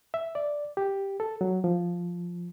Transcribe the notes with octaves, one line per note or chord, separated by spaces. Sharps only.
E5
D5
G4
A4
F#3
F3